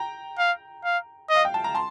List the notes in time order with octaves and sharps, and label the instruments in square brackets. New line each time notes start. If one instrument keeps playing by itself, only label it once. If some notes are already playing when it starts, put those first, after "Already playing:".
Already playing: [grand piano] G5 A#5
[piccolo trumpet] F5
F5
D#5
[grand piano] F5
G5
A5
A#5
A5 C6